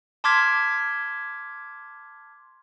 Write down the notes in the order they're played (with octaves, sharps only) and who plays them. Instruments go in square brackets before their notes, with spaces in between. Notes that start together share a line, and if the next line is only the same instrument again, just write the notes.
[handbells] A5 C6 D6 F6 G#6 B6